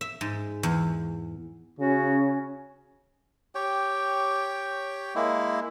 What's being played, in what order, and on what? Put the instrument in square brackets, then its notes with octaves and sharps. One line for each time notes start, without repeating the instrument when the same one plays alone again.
[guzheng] E5
G#2
E2
[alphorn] C#3 [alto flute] C#4 [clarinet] F#4
[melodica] G4 C#5 G5
G#3 A#3 E4